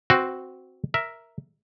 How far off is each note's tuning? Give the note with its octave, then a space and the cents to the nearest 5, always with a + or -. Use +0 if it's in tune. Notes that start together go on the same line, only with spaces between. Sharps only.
C4 +0 F#4 +0 B4 +30
A#4 +0 E5 +0